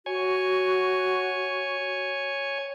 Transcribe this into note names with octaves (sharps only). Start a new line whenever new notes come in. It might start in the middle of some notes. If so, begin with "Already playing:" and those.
F#4 C#5 G#5